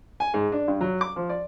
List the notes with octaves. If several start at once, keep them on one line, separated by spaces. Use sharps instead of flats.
G#5
G#2
D4
G2
F#3
D6
F3
D5